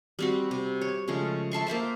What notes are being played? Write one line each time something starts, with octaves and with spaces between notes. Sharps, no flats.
G3 C4 F#4
C3
C#5
C#3 F3 G#3 A3
E5 A5 C6 C#6
A#3 C5 E5 A5